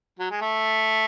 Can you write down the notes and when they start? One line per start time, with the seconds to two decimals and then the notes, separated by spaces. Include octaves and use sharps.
0.19 F#3
0.31 G#3
0.41 A3